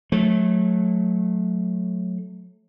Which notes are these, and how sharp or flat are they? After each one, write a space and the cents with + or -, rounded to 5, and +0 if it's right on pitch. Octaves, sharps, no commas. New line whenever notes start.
F#3 -25 A3 -20